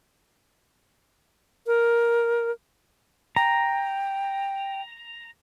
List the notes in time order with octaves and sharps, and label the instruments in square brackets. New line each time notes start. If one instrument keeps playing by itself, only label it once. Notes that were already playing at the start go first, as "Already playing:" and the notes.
[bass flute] A#4
[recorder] G5 [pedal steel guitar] A#5